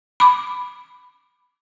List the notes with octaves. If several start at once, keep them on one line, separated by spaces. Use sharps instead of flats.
B5 D6